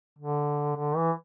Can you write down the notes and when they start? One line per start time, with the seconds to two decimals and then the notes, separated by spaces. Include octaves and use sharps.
0.18 D3
0.76 D3
0.96 E3